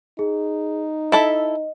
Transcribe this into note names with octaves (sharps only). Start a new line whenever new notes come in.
D#4 G#4
E4 A4 D#5 E5